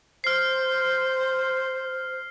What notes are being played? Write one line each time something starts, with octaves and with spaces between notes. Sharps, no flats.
C5 F6 C7